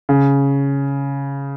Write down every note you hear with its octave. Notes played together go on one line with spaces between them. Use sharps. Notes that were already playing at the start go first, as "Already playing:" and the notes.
C#3